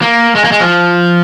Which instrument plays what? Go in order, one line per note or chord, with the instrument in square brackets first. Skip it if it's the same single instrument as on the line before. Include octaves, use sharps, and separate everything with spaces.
[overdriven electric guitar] A#3
G#3
A#3
G#3
F3